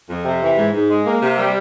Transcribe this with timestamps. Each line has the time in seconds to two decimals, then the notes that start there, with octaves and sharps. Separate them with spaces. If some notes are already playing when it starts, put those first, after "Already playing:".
0.10 F2
0.25 C3
0.42 E3
0.57 G#2
0.73 G#2
0.90 G#3
1.06 A#3
1.22 C3
1.38 G3